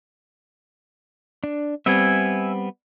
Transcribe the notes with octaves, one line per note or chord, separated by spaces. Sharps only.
D4
G3 B3 C4 E5 G#5